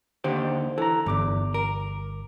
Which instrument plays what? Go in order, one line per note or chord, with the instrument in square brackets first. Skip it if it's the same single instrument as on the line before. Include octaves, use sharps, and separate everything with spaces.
[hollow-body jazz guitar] D#2 D3 G4 [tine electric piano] C5
[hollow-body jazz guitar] E3 [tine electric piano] A4 A#5
[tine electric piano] G1 D6 [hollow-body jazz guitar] E2 G2
[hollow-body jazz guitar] A#4